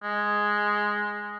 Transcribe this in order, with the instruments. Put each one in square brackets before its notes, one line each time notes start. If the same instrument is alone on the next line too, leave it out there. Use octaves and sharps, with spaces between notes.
[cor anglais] G#3